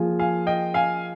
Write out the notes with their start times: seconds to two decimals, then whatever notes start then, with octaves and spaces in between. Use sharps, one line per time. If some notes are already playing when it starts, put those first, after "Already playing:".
Already playing: F3 A#3 F4 G#4
0.19 F5 G#5
0.47 D#5 G5
0.74 F5 G#5